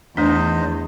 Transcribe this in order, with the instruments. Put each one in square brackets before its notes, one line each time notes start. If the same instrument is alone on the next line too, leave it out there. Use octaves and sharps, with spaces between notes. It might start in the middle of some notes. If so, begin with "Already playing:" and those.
[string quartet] E2 [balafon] A3 D4 [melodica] D#4 C5 D#5